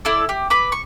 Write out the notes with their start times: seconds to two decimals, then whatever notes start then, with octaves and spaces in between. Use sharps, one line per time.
0.05 E4 A4 D5
0.29 G4
0.50 B4 B5 D6
0.72 C#6